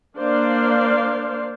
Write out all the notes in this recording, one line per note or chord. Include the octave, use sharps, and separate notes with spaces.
A#3 D4 C5 D5 F5